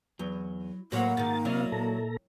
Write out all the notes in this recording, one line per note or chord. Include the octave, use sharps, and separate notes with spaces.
E2 F#3
A2 F#3 A#3 F#4 C5 F#5
G#2 D#3 A6
C3 F#3 E4 D5 D#5 F5
A#2 A4 A#5